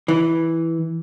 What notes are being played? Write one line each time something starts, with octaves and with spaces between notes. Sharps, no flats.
E3